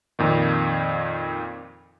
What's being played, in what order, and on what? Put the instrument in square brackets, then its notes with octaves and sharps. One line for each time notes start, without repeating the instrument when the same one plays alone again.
[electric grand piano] F2 A#2 D#3